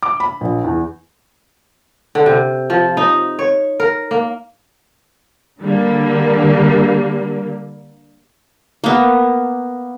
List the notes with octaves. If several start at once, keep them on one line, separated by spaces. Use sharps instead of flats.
D6
B5
A#1
E2
D3
C3
F3
D#4
C#5
A#4
A#3
D3 G3 A#3
A#3 B3